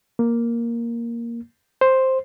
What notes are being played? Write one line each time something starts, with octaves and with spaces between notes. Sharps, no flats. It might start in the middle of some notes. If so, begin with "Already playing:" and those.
A#3
C5